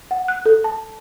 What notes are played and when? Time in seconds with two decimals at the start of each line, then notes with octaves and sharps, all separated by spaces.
0.11 F#5
0.28 F#6
0.46 A4
0.64 A5